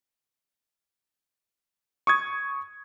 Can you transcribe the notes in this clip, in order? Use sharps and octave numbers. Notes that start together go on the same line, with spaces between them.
C#6 D#6 G#6